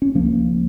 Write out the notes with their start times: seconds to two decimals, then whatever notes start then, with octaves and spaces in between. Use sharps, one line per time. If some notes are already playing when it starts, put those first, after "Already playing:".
0.02 C#4
0.15 C#2 C#3 F3 A#3